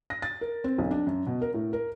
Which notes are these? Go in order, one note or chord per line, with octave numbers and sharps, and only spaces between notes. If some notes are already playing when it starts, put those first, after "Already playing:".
A#6
A6
A#4
C4
B1
D4
F#2
B2
A#4
A2
A#4